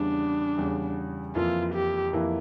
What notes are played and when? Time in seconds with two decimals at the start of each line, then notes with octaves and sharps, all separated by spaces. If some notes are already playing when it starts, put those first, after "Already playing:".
Already playing: E2 C#3 G3 D4
0.58 E2 C#3 G3
1.35 F2 E3 A#3 E4 F4
1.74 G4
2.13 F2 E3 A#3 E4